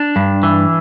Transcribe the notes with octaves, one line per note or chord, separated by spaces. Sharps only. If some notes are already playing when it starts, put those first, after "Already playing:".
Already playing: D4
G2
E3